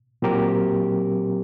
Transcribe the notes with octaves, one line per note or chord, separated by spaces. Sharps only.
A#2 F#3 C4 G4 A#4